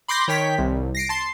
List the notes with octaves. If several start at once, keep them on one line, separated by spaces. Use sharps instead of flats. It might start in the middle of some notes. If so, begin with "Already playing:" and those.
B5 C6 D6 G6 A#6 C7
D#3 C#5 G5 B6
C2
A#6 C7 D7
A5 C6 C7